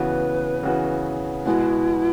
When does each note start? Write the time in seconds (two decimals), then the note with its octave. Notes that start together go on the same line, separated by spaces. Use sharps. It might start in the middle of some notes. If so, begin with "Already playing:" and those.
Already playing: C#3 E3 B3 F#4 B4
0.63 C#3 E3 B3 F#4
1.45 B2 G#3 B3 E4 F#4